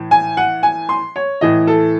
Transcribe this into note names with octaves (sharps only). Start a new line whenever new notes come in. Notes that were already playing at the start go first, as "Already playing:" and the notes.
Already playing: A2 E3
G#5
F#5
G#5
C6
C#5
A2 E3 D#5
A4